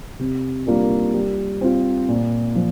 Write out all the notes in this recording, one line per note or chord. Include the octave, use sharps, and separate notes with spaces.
C3
G3 A#3 D4 F4
G3
C4 F4
A#2
F3